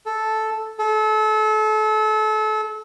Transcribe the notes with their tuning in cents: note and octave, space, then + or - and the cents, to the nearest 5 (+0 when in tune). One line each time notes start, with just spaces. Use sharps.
A4 -5
A4 -30